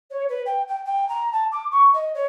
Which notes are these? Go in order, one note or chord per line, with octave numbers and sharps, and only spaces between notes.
C#5
B4
G5
G5
G5
A#5
A5
D6
C#6
D#5
C#5